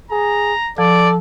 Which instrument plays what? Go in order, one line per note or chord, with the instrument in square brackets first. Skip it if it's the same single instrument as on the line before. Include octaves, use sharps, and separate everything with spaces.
[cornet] G#4 [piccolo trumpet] A#5
[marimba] F3 [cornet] A4 [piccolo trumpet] D5